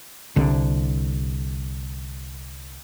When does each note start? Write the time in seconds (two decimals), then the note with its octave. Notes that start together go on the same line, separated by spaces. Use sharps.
0.36 C2 D3